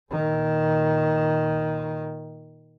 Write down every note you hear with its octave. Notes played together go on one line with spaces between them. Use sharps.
A#2 D#3